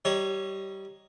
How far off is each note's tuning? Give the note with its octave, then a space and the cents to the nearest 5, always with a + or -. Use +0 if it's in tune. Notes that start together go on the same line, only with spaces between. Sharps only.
G3 -20 D#4 +0 C#5 +0